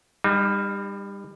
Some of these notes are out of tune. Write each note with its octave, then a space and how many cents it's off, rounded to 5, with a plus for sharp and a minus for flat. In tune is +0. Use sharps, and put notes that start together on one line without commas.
G3 +25 D#4 -35